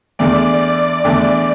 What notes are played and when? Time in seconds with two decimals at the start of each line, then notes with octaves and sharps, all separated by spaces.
0.19 E2 D3 A3 D5
1.04 E2 D3 A3